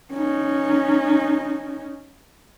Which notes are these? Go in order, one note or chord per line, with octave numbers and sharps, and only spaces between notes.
C#4 D#4